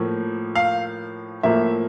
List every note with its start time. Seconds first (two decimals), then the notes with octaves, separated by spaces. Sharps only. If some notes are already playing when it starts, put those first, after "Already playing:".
Already playing: A2 F3 A#3
0.55 F5
1.43 A2 F3 A#3 E5